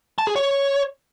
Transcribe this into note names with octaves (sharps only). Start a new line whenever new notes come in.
A5
G#4
C#5